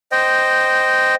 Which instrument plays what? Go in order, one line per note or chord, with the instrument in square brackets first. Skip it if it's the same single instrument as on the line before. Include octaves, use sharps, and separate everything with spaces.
[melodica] C5 D#5 G5